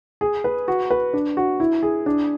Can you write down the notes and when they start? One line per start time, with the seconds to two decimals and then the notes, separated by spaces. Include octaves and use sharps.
0.21 G#4
0.44 B4
0.68 F#4
0.91 B4
1.13 D4
1.37 F#4
1.60 E4
1.83 G#4
2.06 D4